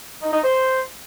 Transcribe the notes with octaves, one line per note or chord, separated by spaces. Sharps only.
D#4
D#4
C5